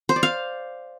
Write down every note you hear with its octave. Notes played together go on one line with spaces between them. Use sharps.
C5
D5
F5